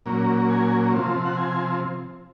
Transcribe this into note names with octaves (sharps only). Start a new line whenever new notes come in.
A#2 F#3 A#3 C#4
G#5
C3 F3 C4
F#5
G#5